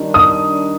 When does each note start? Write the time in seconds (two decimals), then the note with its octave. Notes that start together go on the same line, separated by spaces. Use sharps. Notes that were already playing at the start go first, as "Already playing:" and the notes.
Already playing: D#3 G3 D4
0.14 D#6